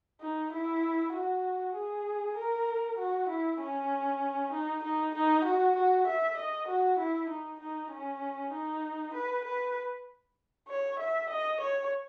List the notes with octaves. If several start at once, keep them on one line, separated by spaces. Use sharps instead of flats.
D#4
E4
F#4
G#4
A#4
F#4
E4
C#4
D#4
D#4
D#4
F#4
F#4
E5
D#5
F#4
E4
D#4
D#4
C#4
D#4
B4
B4
C#5
E5
D#5
C#5